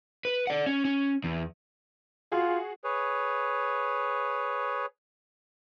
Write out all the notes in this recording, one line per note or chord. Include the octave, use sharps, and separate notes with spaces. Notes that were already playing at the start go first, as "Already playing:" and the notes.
B4
D5 F#5
C#4
C#4
E2
F4 F#4 G#4
G#4 B4 C#5